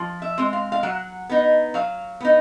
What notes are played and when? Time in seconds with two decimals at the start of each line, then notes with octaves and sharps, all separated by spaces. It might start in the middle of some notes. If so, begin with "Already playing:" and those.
Already playing: F3
0.22 E5
0.38 G#3 C4
0.53 F5
0.72 F5
0.83 F#3 F#5
1.29 B3 D#4
1.74 F#3 F5
2.20 B3 D#4